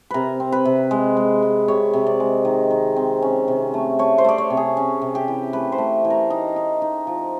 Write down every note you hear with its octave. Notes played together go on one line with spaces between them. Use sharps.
C3 A#4 B4
C4
B4
C3
G#3
G#3
G#3
C3 C#5
C3
D5
G#3
D#3
D#3
C4
C#4
C3
A3
A3 C#5
C5
A3 D5
C#5
C3
G#4
C#4
C3
G4
E3
A3 B4
C5
A3
E3
A#4
D#4
D#4
D#4
F3